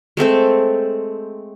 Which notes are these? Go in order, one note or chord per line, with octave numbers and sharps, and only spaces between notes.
G#3 A3 C4 A4